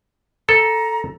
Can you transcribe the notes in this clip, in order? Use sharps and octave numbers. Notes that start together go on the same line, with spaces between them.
A4 A#5